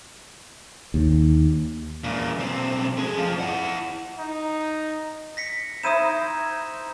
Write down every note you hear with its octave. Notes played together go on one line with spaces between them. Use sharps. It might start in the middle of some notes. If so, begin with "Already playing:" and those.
D#2
E2 A#2
B1 C4
A3 G#4
F2 F3
E4 F#5
D#4
A#6 B6 C#7
D#4 E4 C5 D#6 D#7 E7